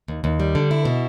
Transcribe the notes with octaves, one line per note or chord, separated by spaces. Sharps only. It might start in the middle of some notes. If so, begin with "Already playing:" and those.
D#2
D#2
G3
D3
E4
B2